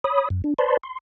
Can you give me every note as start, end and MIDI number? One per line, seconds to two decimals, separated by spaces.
0.04 0.29 73
0.04 0.29 83
0.04 0.29 87
0.30 0.42 42
0.44 0.54 62
0.58 0.77 71
0.58 0.77 72
0.58 0.77 74
0.58 0.77 81
0.58 0.77 83
0.58 0.77 84
0.83 0.98 84